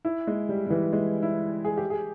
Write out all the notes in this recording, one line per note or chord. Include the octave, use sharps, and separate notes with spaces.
E4
G#3
G3
G3
E3
G#3
E4
G#4
G4
G#4